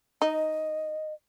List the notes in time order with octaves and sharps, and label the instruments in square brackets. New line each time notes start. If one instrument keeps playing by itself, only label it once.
[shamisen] D#4 [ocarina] D#5